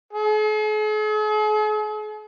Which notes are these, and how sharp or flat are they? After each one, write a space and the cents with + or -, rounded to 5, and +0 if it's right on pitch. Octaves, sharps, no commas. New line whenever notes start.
G#4 +45